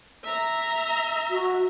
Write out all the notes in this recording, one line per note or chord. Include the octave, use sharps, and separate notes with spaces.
E5 A#5
F#4